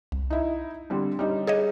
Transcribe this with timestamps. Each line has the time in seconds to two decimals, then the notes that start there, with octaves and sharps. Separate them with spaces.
0.12 C2
0.30 D#4 E4
0.90 D3 G3 C4
1.19 G3 C#4 D#4
1.47 G#4 C#5 D#5